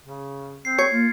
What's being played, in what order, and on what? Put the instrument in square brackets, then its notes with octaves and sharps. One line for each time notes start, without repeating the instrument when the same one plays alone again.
[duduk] C#3
[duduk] C4 [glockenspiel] C7
[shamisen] C#5 [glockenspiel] G#6 C7 C#7
[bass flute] A#3 [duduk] F4